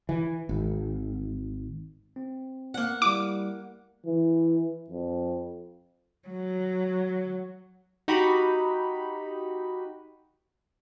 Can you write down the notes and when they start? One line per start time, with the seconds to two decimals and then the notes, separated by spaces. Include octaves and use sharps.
0.09 E3
0.49 G#1
2.16 C4
2.74 A#3 F#5
3.02 G3 E4 D6
4.07 E3
4.90 F2
6.29 F#3
8.08 D#4 F#4 G4 B5